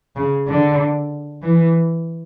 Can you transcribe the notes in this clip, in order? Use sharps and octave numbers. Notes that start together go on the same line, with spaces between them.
C#3
D3
E3